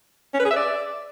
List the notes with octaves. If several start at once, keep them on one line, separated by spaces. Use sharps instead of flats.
C#4
B4
G#4
E5
D5